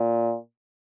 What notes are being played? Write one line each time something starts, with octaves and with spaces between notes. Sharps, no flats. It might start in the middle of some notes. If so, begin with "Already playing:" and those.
Already playing: A#2